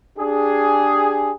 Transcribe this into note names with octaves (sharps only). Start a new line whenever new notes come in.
D4 G4 G#4